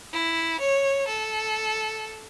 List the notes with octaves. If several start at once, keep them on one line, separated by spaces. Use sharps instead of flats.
E4
C#5
A4